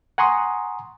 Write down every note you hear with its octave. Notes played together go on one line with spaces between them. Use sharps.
F#5 G#5 A#5 C6 C#6 D#6